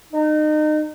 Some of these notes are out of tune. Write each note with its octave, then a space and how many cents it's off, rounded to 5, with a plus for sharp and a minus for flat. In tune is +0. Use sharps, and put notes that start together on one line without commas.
D#4 -30